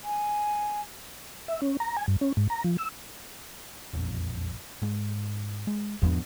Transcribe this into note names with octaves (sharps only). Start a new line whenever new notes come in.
G#5
E5
C#4
A#5
G#5
G2
C#4
G#2
A#5
F3
E6
E1 A#1 F2
G#2 G#3
G#3
E2 G#2 F3 B3 D4